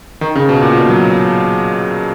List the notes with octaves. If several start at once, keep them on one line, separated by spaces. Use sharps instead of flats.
D#3
C#3
B2
A#2
B2
F#3